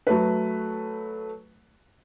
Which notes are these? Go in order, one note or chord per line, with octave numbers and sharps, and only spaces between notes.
F#3 A3 B4